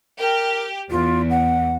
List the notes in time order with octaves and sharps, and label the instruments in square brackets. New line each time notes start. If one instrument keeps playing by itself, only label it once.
[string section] G4 [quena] A#4
[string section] E2 [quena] F4
[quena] F#5